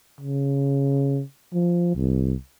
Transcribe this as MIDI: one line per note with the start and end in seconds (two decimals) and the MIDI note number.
0.21 1.21 49
1.54 1.92 53
1.95 2.34 36